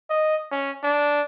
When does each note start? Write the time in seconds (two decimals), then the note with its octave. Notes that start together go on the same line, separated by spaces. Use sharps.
0.10 D#5
0.52 C#4
0.84 D4